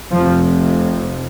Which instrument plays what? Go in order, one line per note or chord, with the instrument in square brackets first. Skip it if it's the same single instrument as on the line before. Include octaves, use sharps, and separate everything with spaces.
[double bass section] F1 F2 C3 F3